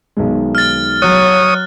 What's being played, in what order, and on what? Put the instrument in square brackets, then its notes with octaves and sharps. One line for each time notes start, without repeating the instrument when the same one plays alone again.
[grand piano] B1 D#3 G#3
[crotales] F6 A6
[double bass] F#3 [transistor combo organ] C#5 D#6 [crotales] F#6